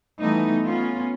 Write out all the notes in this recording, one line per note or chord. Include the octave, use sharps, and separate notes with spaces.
E3 G3 A3 B3 D#4
B3 C#4 F4